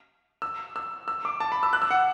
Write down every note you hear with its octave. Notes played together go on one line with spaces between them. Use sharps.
E6
E6
E6
D6
A5
B5
E6
F#6
E6
F#5